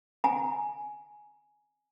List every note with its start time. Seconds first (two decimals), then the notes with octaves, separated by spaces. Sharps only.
0.24 G#5 A#5